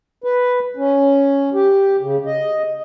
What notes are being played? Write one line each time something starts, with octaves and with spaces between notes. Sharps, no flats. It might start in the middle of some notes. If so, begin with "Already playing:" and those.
B4
C#4
G4
C#3
D#5